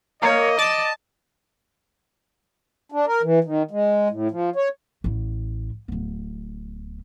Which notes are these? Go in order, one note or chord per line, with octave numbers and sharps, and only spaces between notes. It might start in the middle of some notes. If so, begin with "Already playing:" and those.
A#3 C#5 D#5
D5 A5
D4
A#4
E3
D#3
G#3
A2
F3
C#5
A1 E4
D1 B3